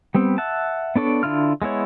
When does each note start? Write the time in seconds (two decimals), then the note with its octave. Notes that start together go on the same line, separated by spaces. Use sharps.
0.15 G3 B3 C4
0.38 E5 F#5 A5
0.96 B3 D4 A4 C#5 D5
1.23 D3 D4 E4 F4 F6
1.62 G#3 B3 E4 C#5